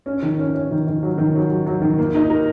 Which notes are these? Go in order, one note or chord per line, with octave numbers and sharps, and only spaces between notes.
C#4
D#3
C#4
C#4
D#3
D#3
F#3
D#3
F#3
F#3
F#3
D#3
A#3
D#4
A#4